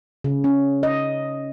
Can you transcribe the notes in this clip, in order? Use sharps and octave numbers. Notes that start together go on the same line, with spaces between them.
C#3
C#4
D#5